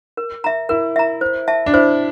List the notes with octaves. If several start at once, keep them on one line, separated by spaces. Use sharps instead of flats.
A#4
E5 A#5
E4 A#4
E5 A#5
C5
E5 A5
D4
E4 C5